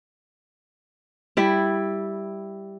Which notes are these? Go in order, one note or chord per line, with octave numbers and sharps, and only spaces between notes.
G3 E4